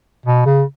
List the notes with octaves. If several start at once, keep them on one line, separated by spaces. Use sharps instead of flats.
B2
C#3